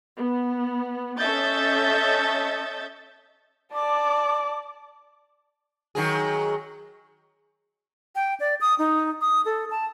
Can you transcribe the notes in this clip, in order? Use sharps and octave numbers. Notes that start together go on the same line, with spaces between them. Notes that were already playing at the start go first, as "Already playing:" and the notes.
B3
C#4 A4 D#5 E5 G6 A6
D5 A5 D6
D#3 F#3 G#4
G5
D5
D#6
D#4
D#6
A4
A5